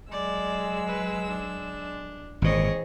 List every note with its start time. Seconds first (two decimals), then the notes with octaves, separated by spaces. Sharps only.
0.12 F#3 G#3 D5 E6
0.87 B4
1.28 D4
2.42 G#1 A#2 E3 C4 G#4 C#5 D#5